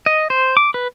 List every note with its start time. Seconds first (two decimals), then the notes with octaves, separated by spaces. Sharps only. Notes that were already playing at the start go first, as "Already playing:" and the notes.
0.06 D#5
0.30 C5
0.57 D6
0.74 B4